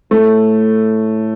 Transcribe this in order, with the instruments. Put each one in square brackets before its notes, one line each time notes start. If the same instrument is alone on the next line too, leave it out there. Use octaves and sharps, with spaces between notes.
[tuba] A2 [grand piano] A3